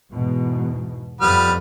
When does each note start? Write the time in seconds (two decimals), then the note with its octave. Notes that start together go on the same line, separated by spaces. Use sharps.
0.13 E2 G#2 B2
1.21 F2 G3 B3 F6